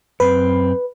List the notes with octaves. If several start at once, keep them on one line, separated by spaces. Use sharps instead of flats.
F#2 C4 B4